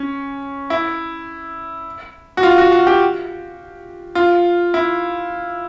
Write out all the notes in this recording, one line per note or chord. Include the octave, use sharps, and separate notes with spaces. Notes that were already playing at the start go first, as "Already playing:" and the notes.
Already playing: C#4
E4
F#4
F4
F#4
F#4
G4
F4
E4